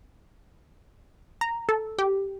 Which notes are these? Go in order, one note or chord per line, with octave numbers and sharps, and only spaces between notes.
A#5
A4
G4